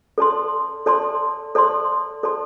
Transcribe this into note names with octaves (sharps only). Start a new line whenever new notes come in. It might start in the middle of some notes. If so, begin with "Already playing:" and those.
A4 D5 A5 C6
A4 D5 A5 C6
A4 D5 A5 C6
A4 D5 A5 C6